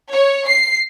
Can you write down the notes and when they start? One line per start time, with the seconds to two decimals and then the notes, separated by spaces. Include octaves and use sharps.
0.11 C#5
0.44 C7